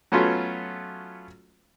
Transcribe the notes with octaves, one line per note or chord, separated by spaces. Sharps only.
F#3 A3 B3 C#4 F4